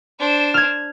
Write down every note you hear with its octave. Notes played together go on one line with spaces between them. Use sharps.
D4 C5
F6 G#6